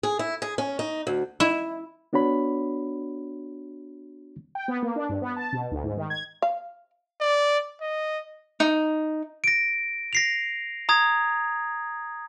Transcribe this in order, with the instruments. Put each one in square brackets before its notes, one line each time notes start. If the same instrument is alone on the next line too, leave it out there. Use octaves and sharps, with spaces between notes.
[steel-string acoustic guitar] G#4
E4
G#4
C#4
D#4
D2
[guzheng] E4
[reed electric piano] B3 D4 F#4 C#5 B5
[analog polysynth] G5
B3
A#3
D4
G2
B3
A5
B2
D2
G#2
D#3
G#6
[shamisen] F5
[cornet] D5
D#5
[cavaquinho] D#4
[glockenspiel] A#6 D7
A#6 C7 F7
A#5 D#6 G#6